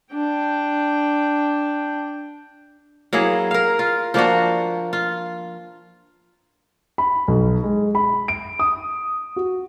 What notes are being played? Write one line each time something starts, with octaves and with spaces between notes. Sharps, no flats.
D4 G5
F#3 A#3 E4 G#4
A#4 F5
F4
F3 A#3 D4 F#4
F4
B5
B1
G#3
B5
D7
D#6
F#4